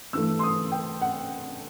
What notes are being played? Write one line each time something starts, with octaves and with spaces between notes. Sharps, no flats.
G2 E3 A3 E6
C6
D#6
G5
F#5